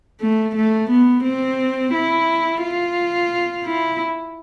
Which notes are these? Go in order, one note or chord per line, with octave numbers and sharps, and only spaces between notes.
A3
A3
B3
C4
E4
F4
E4